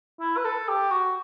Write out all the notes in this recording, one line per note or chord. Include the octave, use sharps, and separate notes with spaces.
E4
B4
A4
G4
F#4